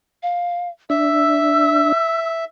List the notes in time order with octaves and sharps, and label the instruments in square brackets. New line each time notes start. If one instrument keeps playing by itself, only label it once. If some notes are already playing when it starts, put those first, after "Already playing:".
[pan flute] F5
[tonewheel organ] D4 [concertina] E5 [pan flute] E6